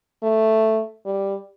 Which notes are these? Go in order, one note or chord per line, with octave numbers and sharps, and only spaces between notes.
A3
G3